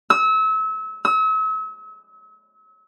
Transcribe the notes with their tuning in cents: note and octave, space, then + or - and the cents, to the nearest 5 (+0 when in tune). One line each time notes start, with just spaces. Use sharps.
E6 -30
E6 -40